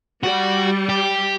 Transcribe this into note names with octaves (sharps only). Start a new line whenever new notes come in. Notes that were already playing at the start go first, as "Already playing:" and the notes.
G3 F#4
G4